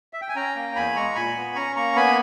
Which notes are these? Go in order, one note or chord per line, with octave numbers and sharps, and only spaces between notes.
E5
G5
G#5
C#4 G5 A#5
A#3
E2 G#5 B5
G#3 A#5 C#6
A#2 G#5 B5
B3
C#4 A#5 C#6
A#3 A#5 C#6
B3 G#5 B5